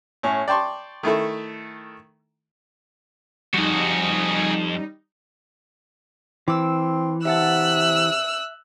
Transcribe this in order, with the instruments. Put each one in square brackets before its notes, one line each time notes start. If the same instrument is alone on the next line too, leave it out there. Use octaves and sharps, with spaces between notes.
[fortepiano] A2 C#4
D5 G5 A5 C6 C#6
D#3 A3 E4 A4
[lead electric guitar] F2 [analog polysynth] G3 D#4 [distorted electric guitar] F#4 G#4
[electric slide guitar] E3 [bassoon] C4 [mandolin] D6 E6
[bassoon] C3 [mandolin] E5 F#5 A5 [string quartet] E6 F#6